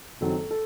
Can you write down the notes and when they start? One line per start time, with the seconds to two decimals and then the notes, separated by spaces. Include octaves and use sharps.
0.21 F#1 F#2 D#3 F#3 C4 A4
0.51 A4